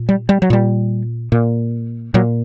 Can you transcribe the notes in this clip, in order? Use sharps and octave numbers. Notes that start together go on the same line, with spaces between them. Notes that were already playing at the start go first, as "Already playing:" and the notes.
Already playing: A#2
G3
G3
F#3
A#2 G3
A#2
A#2 F#3